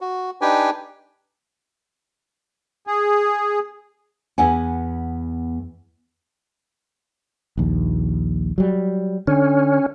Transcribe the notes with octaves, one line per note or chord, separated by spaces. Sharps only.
F#4
D4 D#4 G4 B4 G5 G#5
G#4
E2 B3 F#5 G#5
A#1 D#2
F#3 G3
D3 C#4